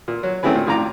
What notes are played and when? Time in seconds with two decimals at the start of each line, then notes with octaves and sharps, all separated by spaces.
0.08 A#2
0.23 F#3
0.43 A3 C4 C#4 E4 G#4 B4
0.55 A#2
0.67 F2 A2 F4 D5 A#5 D6